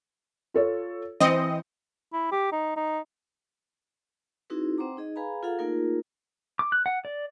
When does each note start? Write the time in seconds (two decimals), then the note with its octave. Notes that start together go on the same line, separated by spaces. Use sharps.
0.54 F4 A4 C#5
1.20 E3 C4 D#5 D#6 C#7
2.13 E4
2.32 G4
2.52 D#4
2.76 D#4
4.50 C4 D#4 E4 F#4 G#4 B4
4.78 C4 C5 F#5 G5 A#5 D6
4.97 D#4 G#4 D#5
5.16 G#4 B4 F5 G#5 A#5 B5
5.43 F4 G#4 A4 F5 F#5 A#5
5.59 A3 A#3 D#4 F4 G#4 A#4
6.59 D6
6.72 F#6
6.86 F#5
7.05 D5